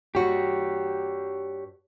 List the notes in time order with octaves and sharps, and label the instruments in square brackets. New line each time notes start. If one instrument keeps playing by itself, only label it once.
[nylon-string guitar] G2 F#4 [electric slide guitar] G4 C#5